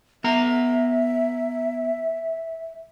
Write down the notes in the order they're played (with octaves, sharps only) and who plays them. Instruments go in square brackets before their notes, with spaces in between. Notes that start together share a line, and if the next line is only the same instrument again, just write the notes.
[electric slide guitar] B3 A#5 [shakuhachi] E5